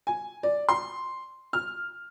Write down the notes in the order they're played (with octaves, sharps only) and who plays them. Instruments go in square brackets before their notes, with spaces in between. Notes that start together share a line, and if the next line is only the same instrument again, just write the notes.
[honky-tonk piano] G#5
D5
C6
F6